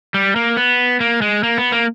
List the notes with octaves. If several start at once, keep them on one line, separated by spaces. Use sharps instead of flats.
G3
A#3
B3
A#3
G#3
A#3
B3
A#3